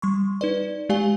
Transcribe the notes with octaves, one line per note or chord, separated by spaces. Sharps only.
G3 C6 C#6
D#4 B4 D5
G#3 G4 D5 F5 G#5 G7